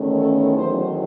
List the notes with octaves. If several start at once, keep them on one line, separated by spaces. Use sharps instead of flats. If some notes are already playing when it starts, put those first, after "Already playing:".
Already playing: E2 D#3 A3 C#4
A4
E2 D#3 F#3 C5